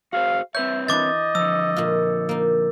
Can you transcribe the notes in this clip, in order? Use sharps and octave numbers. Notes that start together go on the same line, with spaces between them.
F#4 G#4 C5 F5
C4 B4 C#5 E5 G6
E3 D4 E4 D#5 D6 A6
D3 F3 A#5 E6
A#2 F4
A#3 D#4